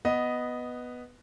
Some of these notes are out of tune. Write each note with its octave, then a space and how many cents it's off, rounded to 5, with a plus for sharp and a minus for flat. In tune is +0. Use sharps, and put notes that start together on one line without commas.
B3 +0 B4 +0 D#5 +0